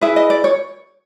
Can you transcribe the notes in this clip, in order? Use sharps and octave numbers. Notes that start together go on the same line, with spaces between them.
E4 G#4 B4 E5
D#5
D5
C#5